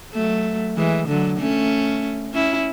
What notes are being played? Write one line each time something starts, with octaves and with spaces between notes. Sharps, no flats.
F#3 A3
E3 G#3
D3 F#3
A3 C#4
C#4 E4